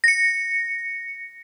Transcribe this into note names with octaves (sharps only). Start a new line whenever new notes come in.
A#6 C#7